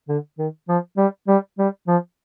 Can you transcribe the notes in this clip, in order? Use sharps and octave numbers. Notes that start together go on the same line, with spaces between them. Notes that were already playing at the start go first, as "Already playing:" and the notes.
D3
D#3
F3
G3
G3
G3
F3